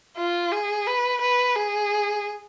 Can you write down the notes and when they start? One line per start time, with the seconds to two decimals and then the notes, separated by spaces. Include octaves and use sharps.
0.17 F4
0.52 G#4
0.87 B4
1.21 B4
1.55 G#4